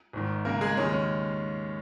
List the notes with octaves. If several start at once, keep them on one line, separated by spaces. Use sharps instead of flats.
G#1 G#2 D#3
C#2 C#3 G#3 A#3 A#4
G#3 G#4
D#2 D#3 G#3 C#4
C#4